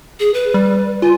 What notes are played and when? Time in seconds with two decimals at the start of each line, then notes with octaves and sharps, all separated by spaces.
0.20 G#4
0.34 B4
0.54 G3
1.02 F4 G#5